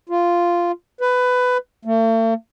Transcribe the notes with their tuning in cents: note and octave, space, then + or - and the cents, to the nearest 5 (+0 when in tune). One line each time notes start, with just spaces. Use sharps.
F4 -5
B4 +15
A3 +45